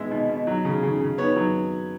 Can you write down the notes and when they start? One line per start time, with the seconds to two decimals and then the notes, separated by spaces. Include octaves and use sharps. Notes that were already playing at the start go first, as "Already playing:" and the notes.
Already playing: B2 G#3 B3 E5
0.11 B2
0.30 B2
0.47 F#3
0.65 C#3
0.83 C#3
1.01 C#3
1.18 B3 C#5
1.36 F#3